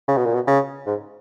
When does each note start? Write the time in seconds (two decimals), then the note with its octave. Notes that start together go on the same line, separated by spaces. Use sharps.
0.08 C#3
0.17 B2
0.25 A#2
0.35 B2
0.47 C#3
0.86 G#2